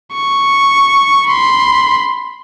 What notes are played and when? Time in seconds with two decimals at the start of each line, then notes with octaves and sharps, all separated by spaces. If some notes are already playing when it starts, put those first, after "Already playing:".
0.14 C#6
1.27 B5 C6